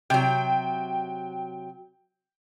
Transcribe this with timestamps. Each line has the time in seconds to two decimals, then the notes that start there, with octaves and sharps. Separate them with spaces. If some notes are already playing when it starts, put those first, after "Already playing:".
0.10 C3 F#3 G5